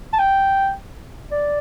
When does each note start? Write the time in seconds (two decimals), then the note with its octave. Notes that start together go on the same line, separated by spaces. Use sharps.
0.13 A5
0.19 G5
1.31 D5